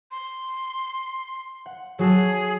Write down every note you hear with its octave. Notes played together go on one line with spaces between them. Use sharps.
C6
F#5
F#3 F#4 G#4 A4